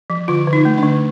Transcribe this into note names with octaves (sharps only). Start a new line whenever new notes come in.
F3
D3 F4
D3
D#4
A3
D4
D3